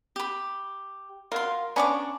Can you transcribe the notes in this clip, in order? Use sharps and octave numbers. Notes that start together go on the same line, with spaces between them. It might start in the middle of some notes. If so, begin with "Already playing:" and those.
G4 B5
F#3 F4 A#4 C6
B3 C#4 D4 A#5 C#6 D6